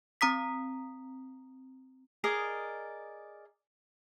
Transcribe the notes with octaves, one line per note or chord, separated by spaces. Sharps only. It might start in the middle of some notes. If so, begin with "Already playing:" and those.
C4 A#5 D#6 B6
G#4 A#4 D5 D#5